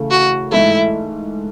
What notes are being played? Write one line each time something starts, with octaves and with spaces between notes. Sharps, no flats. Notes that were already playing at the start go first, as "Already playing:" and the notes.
Already playing: C#3 E3 A3
F#4
G#2 E3 A3 E4